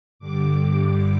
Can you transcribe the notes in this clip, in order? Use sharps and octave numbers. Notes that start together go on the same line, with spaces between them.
G2 D3 G3 D6